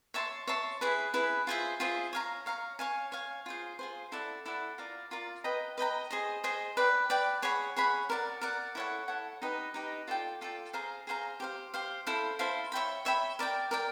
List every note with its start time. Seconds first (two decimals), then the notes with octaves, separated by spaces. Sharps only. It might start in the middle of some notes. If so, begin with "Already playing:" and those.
0.14 C#5 E5 A5 C6
0.47 C#5 E5 A5 C6
0.81 E4 G#4 B4
1.14 E4 G#4 B4
1.47 F4 G#4 C5 E5
1.80 F4 G#4 C5 E5
2.13 C#5 F5 A#5
2.46 C#5 F5 A#5
2.79 C#5 F5 G#5
3.12 C#5 F5 G#5
3.46 F4 G#4 C5
3.79 F4 G#4 C5
4.12 E4 A4 D5 F#5
4.46 E4 A4 D5 F#5
4.78 F4 A#4 D5
5.11 F4 A#4 D5
5.44 B4 D#5 G5 A#5
5.78 B4 D#5 G5 A#5
6.11 G#4 C5 D#5
6.44 G#4 C5 D#5
6.77 B4 D5 G5
7.10 B4 D5 G5
7.42 G#4 C#5 F#5 B5
7.76 G#4 C#5 F#5 B5
8.10 A#4 D5 F#5
8.41 A#4 D5 F#5
8.75 E4 A4 C#5 F#5
9.08 E4 A4 C#5 F#5
9.42 D#4 G4 B4 D#5
9.74 D#4 G4 B4 D#5
10.08 F4 A4 D5 G5
10.41 F4 A4 D5 G5
10.73 G#4 C5 F5 A#5
11.07 G#4 C5 F5 A#5
11.40 G4 C5 F5
11.74 G4 C5 F5
12.07 E4 A4 C5 F5
12.39 E4 A4 C5 F5
12.72 C#5 E5 G5 B5
13.05 C#5 E5 G5 B5
13.39 A#4 D5 G5
13.71 A#4 D5 G5